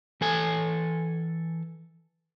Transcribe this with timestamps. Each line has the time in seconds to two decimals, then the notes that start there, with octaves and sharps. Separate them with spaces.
0.21 E3 A4 G#5